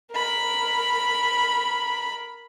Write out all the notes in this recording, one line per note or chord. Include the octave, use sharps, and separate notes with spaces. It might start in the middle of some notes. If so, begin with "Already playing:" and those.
A#4 B5